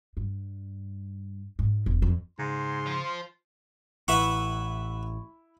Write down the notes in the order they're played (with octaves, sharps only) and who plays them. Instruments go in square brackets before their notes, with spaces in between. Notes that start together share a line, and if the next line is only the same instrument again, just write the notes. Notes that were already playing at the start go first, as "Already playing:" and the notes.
[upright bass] G2
G#2
E1
F2
[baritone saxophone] G#2 [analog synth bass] C#3 [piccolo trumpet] C6
[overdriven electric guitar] F4 C5
[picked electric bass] A1 [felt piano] E4 [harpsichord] B4 E5 F#5 [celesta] C#6